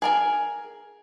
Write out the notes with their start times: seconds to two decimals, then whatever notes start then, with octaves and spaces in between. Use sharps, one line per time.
0.02 G#4 A#4 G#5